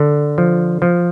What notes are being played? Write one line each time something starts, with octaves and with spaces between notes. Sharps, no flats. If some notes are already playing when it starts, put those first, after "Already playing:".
Already playing: D3
F3
F3